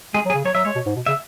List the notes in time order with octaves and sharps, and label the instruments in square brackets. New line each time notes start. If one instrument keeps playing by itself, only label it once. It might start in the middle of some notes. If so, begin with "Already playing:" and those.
[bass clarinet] G#3 [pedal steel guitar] G#4
[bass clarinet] F#3
[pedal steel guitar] G#4
[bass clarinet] C#3
[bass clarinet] F#3 [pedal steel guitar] C#5
[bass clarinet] F#3 [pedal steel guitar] E5
[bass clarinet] G#3 [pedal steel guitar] C#5
[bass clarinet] B2
G#2
B2
[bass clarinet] C#3 [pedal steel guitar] E5